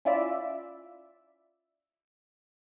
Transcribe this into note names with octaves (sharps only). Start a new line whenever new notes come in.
C#4 E4 F4 D5 E5